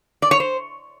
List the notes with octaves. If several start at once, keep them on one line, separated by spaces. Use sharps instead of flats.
D5
C#5
C5